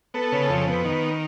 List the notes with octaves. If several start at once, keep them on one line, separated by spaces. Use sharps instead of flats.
B3 A4
C#3
F2
B3
D#3